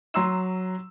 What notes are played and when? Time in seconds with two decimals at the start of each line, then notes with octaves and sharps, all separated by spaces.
0.14 F#3 A#5 C6 E6 E7